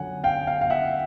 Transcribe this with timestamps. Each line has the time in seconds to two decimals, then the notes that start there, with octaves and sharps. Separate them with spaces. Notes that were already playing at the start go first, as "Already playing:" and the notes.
Already playing: D3 F#3 F#5 G#5
0.24 F5 G5
0.47 F5 G5
0.61 F5
0.70 E5 F#5